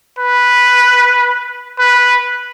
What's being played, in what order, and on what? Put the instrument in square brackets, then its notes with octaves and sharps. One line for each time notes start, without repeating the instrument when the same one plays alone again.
[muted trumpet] B4
B4